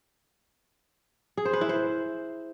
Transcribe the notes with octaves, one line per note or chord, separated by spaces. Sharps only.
G#4
C5
B4
E4
C5